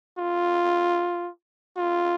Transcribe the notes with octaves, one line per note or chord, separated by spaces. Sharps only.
F4
F4